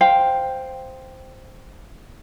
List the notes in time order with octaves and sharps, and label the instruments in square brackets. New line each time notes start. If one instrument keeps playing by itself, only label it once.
[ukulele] C5 F5 G5